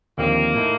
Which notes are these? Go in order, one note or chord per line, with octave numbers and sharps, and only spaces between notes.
D#2 D3 F3 A#3 C4 G4
A2 A3 D#4